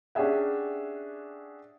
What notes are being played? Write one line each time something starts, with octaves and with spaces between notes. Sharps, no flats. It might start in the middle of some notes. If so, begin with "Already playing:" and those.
C#4 D4 G4 G#4 E5 F#5